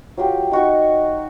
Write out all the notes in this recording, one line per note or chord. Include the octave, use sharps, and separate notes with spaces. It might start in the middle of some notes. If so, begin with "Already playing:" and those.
F#3 F4 G4
D#4 F#4 C#6